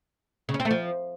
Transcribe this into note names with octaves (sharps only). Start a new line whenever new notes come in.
C#3
C#4
C4
A3
F3